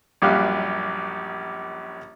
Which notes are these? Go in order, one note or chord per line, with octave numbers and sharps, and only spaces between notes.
A#1 F#2 G3 G4 F5 F#6